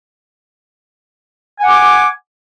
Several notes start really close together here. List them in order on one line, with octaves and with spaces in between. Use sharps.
G#5 F#5 D6